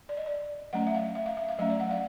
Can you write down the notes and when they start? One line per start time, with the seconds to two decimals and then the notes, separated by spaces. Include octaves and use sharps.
0.09 D5
0.17 D#5
0.26 D5
0.73 F#3 A3 C#4 F#5
0.87 E5
0.95 F5
1.15 E5
1.26 F5
1.37 E5
1.49 F5
1.59 F#3 A3 C#4 E5
1.70 D5
1.80 F#5
1.91 F5